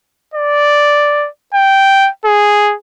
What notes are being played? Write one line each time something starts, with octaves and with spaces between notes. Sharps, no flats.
D5
G5
G#4